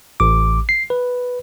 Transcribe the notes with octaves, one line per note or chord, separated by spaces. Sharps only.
A1 D6
C7
B4